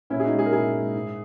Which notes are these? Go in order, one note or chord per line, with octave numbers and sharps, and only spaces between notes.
A#2 C#4 E4
G#4
D#4 F#4
G#3
G#4
A#4
A#2 E4 G#4
G#3
G#2